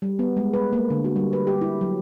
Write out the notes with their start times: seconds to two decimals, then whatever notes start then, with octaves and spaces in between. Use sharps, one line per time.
0.02 G3
0.19 B3
0.37 G#3
0.53 B4
0.73 A#3
0.90 D3
1.04 F#4
1.16 G3
1.33 B4
1.47 G4
1.61 E4
1.81 F#3